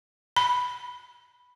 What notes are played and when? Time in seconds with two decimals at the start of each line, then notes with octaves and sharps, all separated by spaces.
0.36 B5